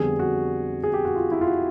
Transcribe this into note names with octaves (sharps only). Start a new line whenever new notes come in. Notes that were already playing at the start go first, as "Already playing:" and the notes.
Already playing: F2 D3 G3 B3 G#4
F#4
G#4
G4
F#4
F4
E4
F4
F#4